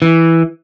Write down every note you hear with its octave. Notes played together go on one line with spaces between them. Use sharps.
E3